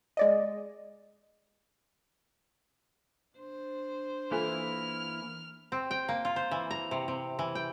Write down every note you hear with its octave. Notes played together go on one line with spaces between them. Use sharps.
G#3 D5 D#5
D4 C5
E3 A#3 E4 F4 A4 G#5 F6
C4
G5
A#3
F4
C5
E3
A#5
C3
C3
E3
G5